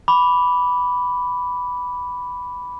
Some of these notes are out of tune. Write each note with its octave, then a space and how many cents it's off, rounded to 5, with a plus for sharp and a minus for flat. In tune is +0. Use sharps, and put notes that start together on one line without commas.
B5 +0 D6 -15